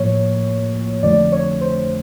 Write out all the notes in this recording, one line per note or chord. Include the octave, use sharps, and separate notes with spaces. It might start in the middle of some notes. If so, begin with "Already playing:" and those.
Already playing: A2 F3 A#3 C#5
F2 D3 F3 A3 D5
C#5
C5